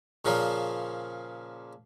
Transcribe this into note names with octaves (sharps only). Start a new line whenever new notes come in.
A#2 C#3 F3 A#3